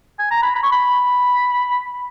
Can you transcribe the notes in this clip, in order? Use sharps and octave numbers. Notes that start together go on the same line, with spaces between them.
G#5
A#5
B5
B5
C#6
B5